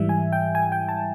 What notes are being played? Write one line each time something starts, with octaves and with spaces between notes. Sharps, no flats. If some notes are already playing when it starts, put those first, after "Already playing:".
Already playing: G#2 E3 G3 E5
G#5
G5
G#5
G5
A5